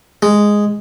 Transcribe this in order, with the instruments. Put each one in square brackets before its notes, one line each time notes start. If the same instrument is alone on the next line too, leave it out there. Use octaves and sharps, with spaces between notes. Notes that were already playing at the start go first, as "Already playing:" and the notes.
[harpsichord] G#3